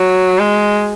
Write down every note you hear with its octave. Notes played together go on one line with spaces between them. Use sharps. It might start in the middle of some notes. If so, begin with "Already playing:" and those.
Already playing: F#3
G#3